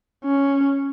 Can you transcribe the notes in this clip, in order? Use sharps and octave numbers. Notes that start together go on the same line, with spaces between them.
C#4